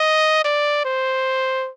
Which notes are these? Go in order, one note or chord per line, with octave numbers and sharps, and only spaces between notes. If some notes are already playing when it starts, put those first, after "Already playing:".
Already playing: D#5
D5
C5